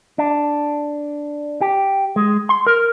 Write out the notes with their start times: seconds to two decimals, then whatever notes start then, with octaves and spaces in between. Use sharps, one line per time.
0.18 D4
1.61 G4
2.16 G#3
2.49 C6
2.67 A#4